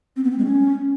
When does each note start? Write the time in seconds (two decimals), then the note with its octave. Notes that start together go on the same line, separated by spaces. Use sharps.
0.16 C4
0.24 B3
0.31 C4
0.38 G#3
0.45 C#4